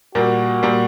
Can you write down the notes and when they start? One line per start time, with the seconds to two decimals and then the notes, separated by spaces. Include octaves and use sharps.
0.15 A#2 G3 A#3 F#4
0.63 A#2 G3 A#3